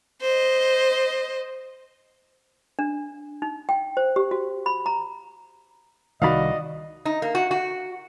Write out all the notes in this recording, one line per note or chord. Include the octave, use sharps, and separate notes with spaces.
C5 D#5
D4
D#4
G5
C5
G4
F#4
B5
A#5
C2 D#3 F#4 D5 D#5 F5 B5
D#4
A#3
F#4
F#4